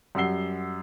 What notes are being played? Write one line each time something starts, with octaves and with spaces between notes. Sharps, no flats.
F#2 G3 F#5 E6 C7 G7